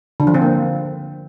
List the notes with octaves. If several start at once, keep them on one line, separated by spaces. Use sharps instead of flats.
D3
F3
C4
A#3